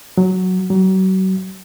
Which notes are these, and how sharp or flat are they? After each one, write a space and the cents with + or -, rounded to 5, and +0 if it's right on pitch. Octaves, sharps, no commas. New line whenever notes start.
F#3 +0
F#3 +35